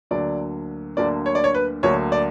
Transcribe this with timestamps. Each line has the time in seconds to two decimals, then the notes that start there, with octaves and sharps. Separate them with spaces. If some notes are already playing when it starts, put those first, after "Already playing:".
0.11 D2 D3 F#3 A#3 D5
0.97 D2 D3 F#3 A#3 D5
1.26 C#5
1.35 D5
1.44 C#5
1.55 B4
1.83 D2 D3 F#3 A#3 C#5
2.12 D5